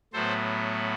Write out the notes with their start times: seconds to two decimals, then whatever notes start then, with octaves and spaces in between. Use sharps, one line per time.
0.13 A2 F#3 B3 A4 C5